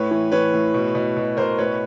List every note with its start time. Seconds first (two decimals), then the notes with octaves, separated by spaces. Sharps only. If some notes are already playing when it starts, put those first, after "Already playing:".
Already playing: A2 B4 C#5
0.11 E3
0.32 E3 B4 C#5
0.54 A2
0.74 B2
0.95 B2
1.17 B2
1.37 B2 A#4 C5
1.58 A2 B4 C#5